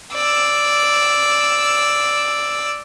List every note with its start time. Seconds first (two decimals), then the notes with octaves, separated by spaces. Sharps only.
0.14 D5 E6